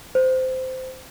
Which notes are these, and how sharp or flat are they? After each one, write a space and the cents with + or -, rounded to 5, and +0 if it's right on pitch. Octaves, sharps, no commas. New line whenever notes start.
C5 -15